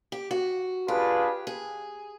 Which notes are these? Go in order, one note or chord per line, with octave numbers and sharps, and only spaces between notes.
G4
F#4
D4 F4 G4 G#4 B4
G#4